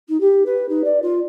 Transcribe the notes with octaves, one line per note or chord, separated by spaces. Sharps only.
D#4
G4
B4
D#4
D5
F4